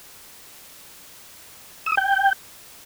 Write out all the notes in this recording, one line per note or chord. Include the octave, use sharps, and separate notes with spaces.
E6
D#6
G5